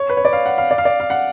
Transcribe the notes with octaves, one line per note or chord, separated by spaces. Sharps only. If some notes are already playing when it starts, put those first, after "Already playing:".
Already playing: C#5
B4
C#5
D5
F5
F#5
F5
D5
F5
D5
F5
F#5